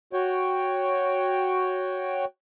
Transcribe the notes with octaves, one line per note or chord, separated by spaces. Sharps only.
F#4 C#5 G5